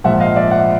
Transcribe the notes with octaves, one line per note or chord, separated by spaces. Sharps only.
A#1 G#2 F3 E5 F#5
D#5 F5
D5 E5
E5 F#5